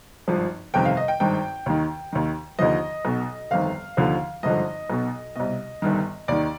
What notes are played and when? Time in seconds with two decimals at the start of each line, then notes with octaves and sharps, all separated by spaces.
0.28 G#1 G2 F3
0.74 G1 F2 C3 D#3 G5
0.85 F5
0.97 D#5
1.08 G5
1.20 G#1 G2 D#3 G5
1.66 D#2 D#3
2.13 D#2 D#3
2.59 D#2 D3 F3 D#5
3.05 B1 B2
3.51 G1 F2 D#3 F5
3.97 D#2 D3 F3
4.43 G#1 G2 D3 F3 D#5
4.90 B1 B2
5.36 C2 B2 D#5
5.82 G1 G2 D#3
6.28 D#2 D#3 D5